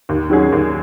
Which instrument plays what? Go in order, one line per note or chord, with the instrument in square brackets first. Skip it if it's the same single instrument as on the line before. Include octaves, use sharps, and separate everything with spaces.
[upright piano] D#2
D#3 F#3 C#4 G#4
D#2